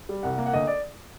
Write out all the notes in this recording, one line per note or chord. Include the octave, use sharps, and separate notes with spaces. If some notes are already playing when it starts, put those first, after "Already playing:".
G3
C2 F#5
A#3
F#5
D2 D#5
D5